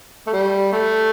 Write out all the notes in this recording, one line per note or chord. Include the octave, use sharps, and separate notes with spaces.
A3
G3
A3